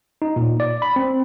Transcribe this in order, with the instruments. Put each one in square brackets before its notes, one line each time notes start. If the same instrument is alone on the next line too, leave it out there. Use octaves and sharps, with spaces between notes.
[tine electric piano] D#4
A#2
D5
B5
C4